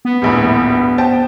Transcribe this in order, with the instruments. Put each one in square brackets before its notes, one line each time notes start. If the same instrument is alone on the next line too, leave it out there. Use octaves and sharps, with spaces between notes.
[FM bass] B3
[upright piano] D#1 A#1 A2
C5 G5 A5